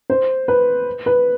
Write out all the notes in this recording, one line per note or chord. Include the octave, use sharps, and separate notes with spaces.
C5
B4
B4